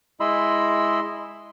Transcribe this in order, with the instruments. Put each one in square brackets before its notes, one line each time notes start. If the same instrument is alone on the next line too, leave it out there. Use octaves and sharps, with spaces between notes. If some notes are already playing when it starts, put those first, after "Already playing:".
[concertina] G#3 E4 D#5 B5 C6 E6